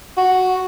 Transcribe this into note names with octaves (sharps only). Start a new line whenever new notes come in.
F#4